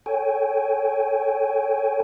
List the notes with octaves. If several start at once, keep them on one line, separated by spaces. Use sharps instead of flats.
A4 C#5 G5 G#5